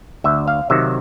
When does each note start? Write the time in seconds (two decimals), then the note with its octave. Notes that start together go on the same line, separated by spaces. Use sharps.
0.24 D2 E5
0.48 F5
0.70 C3 D#3 F#3 E5